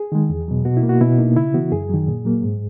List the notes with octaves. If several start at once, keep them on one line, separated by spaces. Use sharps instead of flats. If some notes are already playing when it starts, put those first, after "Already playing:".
Already playing: G#4
D#3 G#3
E2
B2 F#3
B2 F#4
E4
A#3
F#4
B2 E4
A#3 D#4
C#3 E4
E3 B3 F#4
F#2 G#4
D#3 F#3
A#2
F#3 A#3
G#2